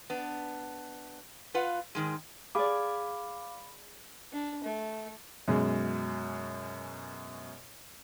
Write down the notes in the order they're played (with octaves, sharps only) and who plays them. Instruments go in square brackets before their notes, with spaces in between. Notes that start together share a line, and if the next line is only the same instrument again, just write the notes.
[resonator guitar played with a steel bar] B3 D4
F4 B4 F5 F#5
G#2 D#3 G#3
[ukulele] G#4 D5 [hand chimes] F5 D6 [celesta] B5
[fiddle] D4
A3
[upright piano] F#2 B2 G#3